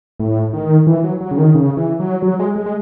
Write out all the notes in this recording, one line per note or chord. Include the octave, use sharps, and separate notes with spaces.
A2
D#3
E3
F#3
F#3
C#3
D#3
C#3
E3
F#3
F#3
G#3
G#3
G#3